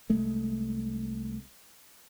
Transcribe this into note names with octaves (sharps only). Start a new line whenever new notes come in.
C2 G#3 A3